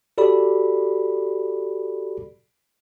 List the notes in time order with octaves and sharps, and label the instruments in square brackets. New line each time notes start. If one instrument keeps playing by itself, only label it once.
[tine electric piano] F#4 G4 A4 D5 B5